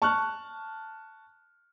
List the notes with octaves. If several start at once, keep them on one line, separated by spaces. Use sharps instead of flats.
A5 C#6 F6 F#6